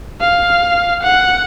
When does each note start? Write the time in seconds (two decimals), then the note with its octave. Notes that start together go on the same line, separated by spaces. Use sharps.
0.21 F5
1.03 F#5